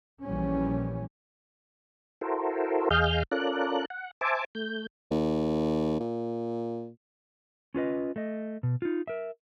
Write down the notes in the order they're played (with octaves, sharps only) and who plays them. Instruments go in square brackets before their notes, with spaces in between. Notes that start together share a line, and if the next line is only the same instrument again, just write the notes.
[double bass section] A#1 E3 G3 C#4
[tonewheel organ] E4 F#4 A4 A#4 C5
E2 G#4 D#5 F5 F6 G6
C#4 F4 A4 A#4 D5 F#6
F#5
C5 E5 G#5 A5 D6
A3 G6
[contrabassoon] D#2
A#2
[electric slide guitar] C#4 F4 B4 D#5
A3 D#5
B2
D#4 F4
A#4 E5